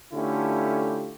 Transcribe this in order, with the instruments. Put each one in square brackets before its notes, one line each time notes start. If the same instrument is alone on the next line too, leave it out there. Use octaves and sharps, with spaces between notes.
[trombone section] D3 A3 C#4 E4 F4 G4